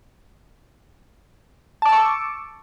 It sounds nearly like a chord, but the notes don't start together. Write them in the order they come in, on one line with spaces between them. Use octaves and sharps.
A5 D6 E6 C#6